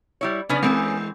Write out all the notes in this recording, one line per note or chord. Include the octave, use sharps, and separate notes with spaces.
G3 E4 C#5
C#3 B3 C#4 D4 B4 D5
E3 G#3 C4 C5